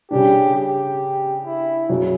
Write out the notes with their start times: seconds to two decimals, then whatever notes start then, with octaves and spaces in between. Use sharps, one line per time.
0.11 C#3 G3 D4 G4
0.55 G4
1.45 E4
1.89 F#2 C#3 F#3 C#4